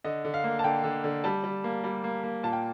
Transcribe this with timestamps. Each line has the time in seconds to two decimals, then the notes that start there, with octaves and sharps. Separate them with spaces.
0.04 D3 D#5
0.24 D3
0.34 F5
0.44 A#3
0.59 A5
0.64 D3 G5
0.84 D3
1.04 D3
1.24 G3 A5
1.44 G3
1.64 A#3
1.84 G3
2.04 A#3
2.24 A#3
2.43 A#2 A5
2.53 G5